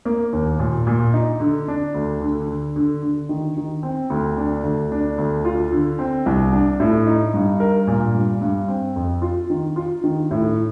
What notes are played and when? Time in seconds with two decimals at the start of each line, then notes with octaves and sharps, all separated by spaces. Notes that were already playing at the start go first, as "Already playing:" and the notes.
0.05 A#3
0.33 D#2
0.59 A#2
0.87 A#2
1.14 D#4
1.40 D3
1.68 D4
1.94 D2
2.22 D3
2.48 D3
2.76 D3
3.02 D3
3.29 D#3
3.57 D#3
3.83 C4
4.10 D2
4.38 D4
4.63 D2
4.92 D4
5.18 D2
5.45 F4
5.72 D3
5.99 C4
6.26 C2
6.52 D4
6.80 A2
7.07 D#4
7.34 G2
7.60 A#4
7.87 A#2
8.15 G2
8.41 G2
8.68 C4
8.96 F2
9.22 F4
9.50 D#3
9.76 F4
10.04 D#3
10.31 A2